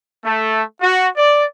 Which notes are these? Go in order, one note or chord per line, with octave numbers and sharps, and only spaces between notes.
A3
F#4
D5